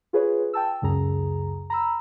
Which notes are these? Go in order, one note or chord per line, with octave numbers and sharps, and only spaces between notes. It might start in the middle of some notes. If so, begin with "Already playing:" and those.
F4 G#4 B4 C#5
G5 A5 E6
C#2 F#2 C#3 G#4 A#5
A#5 B5 E6